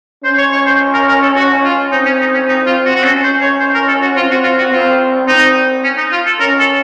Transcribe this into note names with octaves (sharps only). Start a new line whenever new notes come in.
C#4 C5
C#5
C#5
C5
A#4
A#4
A4
F#4
F4
C4 D#4
C#4
D#4
C#4
D#4
F4
F#4
F#4
C#4 A4
C5
C#5
C5
A#4
A4
F#4
C4 F4
F#4
F4
F#4
C4 F4
C4 D#4
C#4
D#4
F4
A4
C#4 A#4
A4